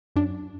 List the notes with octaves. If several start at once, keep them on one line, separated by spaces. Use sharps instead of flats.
F#2 D4